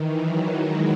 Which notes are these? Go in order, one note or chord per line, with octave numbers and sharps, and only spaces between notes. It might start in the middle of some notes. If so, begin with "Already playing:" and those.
Already playing: D#3 E3
F#3
G#3